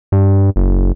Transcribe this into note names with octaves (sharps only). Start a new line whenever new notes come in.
G2
F#1